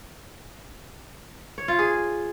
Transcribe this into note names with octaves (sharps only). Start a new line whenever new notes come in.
C#5
F4
G#4